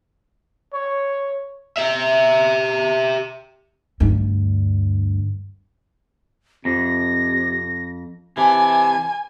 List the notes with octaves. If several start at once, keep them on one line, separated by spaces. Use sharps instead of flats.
C#5
G4 E5
D2 G2
F2 C3 A#6
C3 E3 G#5 A5